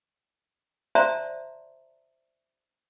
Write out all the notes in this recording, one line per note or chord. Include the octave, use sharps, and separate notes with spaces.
C5 D5 E5 A5 A#5 C6